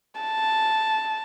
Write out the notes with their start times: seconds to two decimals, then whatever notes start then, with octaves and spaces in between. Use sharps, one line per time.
0.21 A5